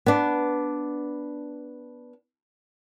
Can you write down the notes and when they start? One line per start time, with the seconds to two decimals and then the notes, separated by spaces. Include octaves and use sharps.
0.06 B3 D4